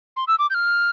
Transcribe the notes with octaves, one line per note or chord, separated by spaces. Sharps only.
C6
E6
D6
G6
F6